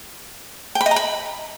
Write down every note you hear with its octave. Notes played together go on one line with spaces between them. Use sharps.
G5
B5
D#5
A#5
B5